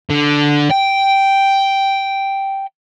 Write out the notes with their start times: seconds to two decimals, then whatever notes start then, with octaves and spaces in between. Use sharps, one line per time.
0.10 D3
0.70 G5